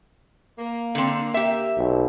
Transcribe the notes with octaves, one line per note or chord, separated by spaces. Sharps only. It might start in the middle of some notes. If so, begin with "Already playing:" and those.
A#3
D3 C4
G4 E5
B1